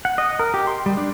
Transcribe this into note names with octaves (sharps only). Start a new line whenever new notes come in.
F#5
D#5
A#4
G4
C6
G3
D4